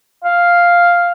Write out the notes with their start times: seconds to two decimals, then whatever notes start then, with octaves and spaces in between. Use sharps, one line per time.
0.24 F5